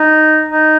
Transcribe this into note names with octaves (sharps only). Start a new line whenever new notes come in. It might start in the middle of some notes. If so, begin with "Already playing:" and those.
Already playing: D#4
D#4